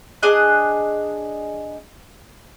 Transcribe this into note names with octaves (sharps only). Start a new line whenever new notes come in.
D4 G#4 D#5 F#6